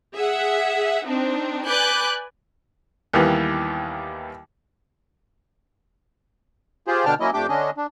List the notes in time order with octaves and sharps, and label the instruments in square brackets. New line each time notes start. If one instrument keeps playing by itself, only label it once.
[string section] G#4 E5 F#5
C4 D4 D#4
B4 D5 G#5 D6 F#6 G6
[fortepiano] D#2 D#3 E3 G3 B3
[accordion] F4 G4 G#4 C5
B2 D3 D4 G5 A5 F6
F#3 A#3 C#4 E4 D#5
F2 A3 D4 G4 G5 D6
D3 C#4 D4 D#5
D4